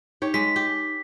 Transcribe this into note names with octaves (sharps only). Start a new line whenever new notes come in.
D#4 G4 C#5
G#3 B6
G4